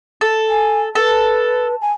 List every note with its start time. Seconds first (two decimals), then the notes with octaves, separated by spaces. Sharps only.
0.21 A4
0.49 G#5
0.95 A4 B4
1.81 G#5